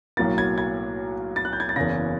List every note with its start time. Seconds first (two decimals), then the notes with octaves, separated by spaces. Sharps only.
0.17 B1 A2 F#3 A#3 A6
0.38 G#6
0.58 G#6
1.36 A6
1.45 F#6
1.53 G6
1.60 G#6
1.69 A6
1.76 F#1 E2 C#3 A#6